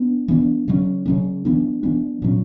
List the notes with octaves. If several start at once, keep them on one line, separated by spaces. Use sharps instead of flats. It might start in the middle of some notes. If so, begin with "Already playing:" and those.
Already playing: B3 D4
E3 B3 D4
C#3 F#3 C#4
C#3 F#3 C#4
E3 B3 D4
E3 B3 D4
A#2 F#3 C#4